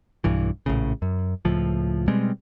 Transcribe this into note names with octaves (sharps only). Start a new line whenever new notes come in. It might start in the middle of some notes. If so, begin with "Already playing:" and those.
B1 G2 E3
A#1 A2 C#3
F#2
C#2 A2 F3
B2 G3 G#3 C4